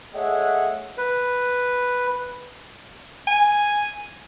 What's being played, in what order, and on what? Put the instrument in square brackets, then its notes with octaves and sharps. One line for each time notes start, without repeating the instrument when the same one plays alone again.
[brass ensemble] A3 G#4 C#5 D#5 E5 F#5
[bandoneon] B4
[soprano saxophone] G#5